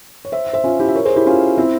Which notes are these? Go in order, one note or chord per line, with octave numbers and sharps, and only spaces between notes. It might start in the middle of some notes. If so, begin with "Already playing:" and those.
C#5
C5 E5
C5 E5
C#4 F4
E4 G4
E5
A#4 C#5
G#4 C5
E4 G4
C#4 F4
C4 E4